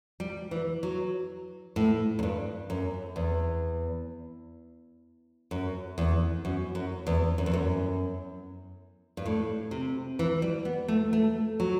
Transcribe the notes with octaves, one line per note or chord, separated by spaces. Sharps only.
G3
E3
F#3
A2
F#2
G2
F#2
E2
F#2
E2
F#2
F#2
E2
F#2
E2
F#2
G2
A2
C3
E3
G3
B3
A3
A3
F#3